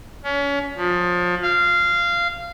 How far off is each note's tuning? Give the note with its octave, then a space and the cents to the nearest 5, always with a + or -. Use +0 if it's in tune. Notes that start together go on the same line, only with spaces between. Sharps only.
C#4 +30
F3 +25
F5 -15